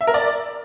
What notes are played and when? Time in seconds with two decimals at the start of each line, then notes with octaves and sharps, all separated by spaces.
0.01 E5
0.07 A#4
0.14 D5